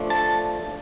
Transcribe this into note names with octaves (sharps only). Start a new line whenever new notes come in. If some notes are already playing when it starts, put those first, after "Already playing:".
Already playing: F3 A3 D4
A5